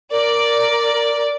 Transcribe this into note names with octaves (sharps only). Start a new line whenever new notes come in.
A#4 D5